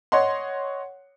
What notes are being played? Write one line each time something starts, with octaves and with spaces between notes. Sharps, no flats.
C#5 D#5 F#5 C6